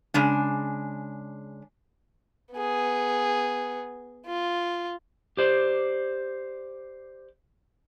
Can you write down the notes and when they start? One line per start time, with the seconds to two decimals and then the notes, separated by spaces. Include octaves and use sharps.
0.14 C#3 G#3 D4
2.52 B3 G#4
4.26 F4
5.37 G4 C5 D5